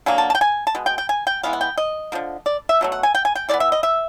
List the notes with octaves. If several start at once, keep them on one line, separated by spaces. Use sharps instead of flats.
D3 F#3 A#3 G#5
A5
A5
G5
G#5
A5
B2 G#3
G5
G5
G#5
G5
E3 G#3 B3 F5
F#5
G5
D#5
D3 F3 A#3
D5
E5
B2 F#3 A3
F#5
G#5
G5
G#5
G5
E3 G#3 B3 D5
E5
D#5
E5